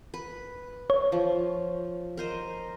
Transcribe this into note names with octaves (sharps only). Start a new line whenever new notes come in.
B4
C#5
F3
A#4 C5 D#5